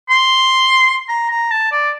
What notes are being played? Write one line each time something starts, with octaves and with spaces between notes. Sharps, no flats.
C6
A#5
A#5
A5
D5